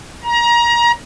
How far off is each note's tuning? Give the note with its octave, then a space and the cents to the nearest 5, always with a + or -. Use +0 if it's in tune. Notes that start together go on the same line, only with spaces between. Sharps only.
A#5 +25